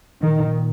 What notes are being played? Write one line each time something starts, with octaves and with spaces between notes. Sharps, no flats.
A#2 D#3